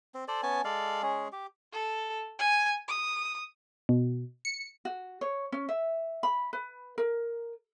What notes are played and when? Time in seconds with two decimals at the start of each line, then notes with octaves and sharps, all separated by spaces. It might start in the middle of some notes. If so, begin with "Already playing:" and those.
0.14 C4
0.28 A4 C5 D5
0.43 B3 C#4 G#5 A5
0.65 G#3 A4 D5 F5
1.03 G#3 C#4 G#4
1.32 G4
1.73 A4
2.39 G#5
2.88 D#6
3.89 B2
4.45 C#7
4.85 F#4
5.21 C#5
5.52 C#4
5.69 E5
6.23 B5
6.53 B4
6.98 A#4